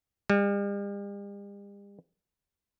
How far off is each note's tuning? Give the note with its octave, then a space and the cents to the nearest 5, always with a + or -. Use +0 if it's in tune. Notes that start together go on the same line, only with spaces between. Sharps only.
G3 +45